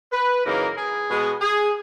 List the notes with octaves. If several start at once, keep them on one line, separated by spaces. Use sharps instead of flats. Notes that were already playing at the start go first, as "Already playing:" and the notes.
B4
F#2 C#3 E3 A#3 D#4 A#4
G#4
B2 G#3 B3
G#4